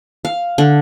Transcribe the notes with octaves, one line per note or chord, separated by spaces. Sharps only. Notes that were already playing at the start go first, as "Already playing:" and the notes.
F5
D3